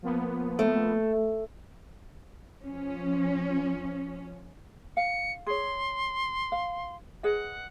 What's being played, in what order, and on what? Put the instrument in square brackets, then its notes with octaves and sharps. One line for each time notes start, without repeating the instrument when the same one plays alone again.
[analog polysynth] F3 A#3 B3
[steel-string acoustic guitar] A3
[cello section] F3 C#4
[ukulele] F5 [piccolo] C#7
[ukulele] G#4 C#5 [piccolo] C6
[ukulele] F5
[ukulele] G#4 B4 D#5 [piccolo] F#5